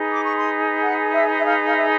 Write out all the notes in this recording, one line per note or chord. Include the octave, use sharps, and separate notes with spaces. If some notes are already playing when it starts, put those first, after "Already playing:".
Already playing: D#4 G#4 B4
D6
C#6
C6
F#5
E5
E5
F5
F5
E5